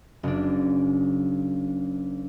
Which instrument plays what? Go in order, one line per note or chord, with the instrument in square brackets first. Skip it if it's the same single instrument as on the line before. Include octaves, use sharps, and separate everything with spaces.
[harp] F#1 D4